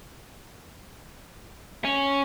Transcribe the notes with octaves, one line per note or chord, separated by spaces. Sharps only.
C#4